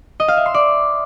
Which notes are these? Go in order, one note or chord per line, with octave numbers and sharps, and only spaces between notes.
D#5
F5
E5
C6
D5